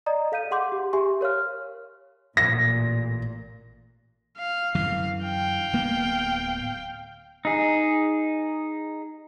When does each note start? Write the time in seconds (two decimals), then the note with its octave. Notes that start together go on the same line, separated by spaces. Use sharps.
0.06 D5 D#5 A#5 D#6
0.32 A4 F5 G6 D#7
0.51 G#4 F#5 C6 D6 G6
0.72 G4 G#4
0.93 G4 E5 G#5 C6 C#6
1.21 A#4 C#5 F5 F6
2.37 A1 A#2 A#6
4.37 F5
4.75 F#2 D3 E3 F5
5.23 F5 G5
5.73 D1 A#3 B3
7.45 D#4 G#4